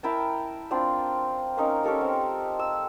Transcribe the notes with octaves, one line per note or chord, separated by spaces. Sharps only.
E4 A#4 G5 A5
C4 D4 F4 G5
A#3 C#4 D#4 A#4
C#4 G4 A4 A#4
C4
E6